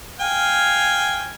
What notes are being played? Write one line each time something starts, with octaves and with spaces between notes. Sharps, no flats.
F5 G5 G#5